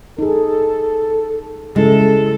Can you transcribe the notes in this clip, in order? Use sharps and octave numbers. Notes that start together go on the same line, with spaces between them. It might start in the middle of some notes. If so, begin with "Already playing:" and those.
D#4 G#4 A4
C#3 G#3 C#4 E4 A4